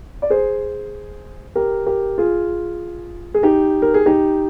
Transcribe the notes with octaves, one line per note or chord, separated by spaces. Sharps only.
D5
G#4 C5
G4 A#4
G4 A#4
F4 G#4
G#4
D#4 G4
A#4
G#4
D#4 G4